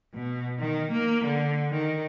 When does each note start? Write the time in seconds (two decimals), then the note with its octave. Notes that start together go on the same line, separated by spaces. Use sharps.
0.14 B2
0.59 D#3
0.91 A#3
1.24 D3
1.73 D#3